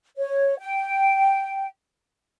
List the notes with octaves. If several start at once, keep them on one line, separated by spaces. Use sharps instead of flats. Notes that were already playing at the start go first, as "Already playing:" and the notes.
C#5
G5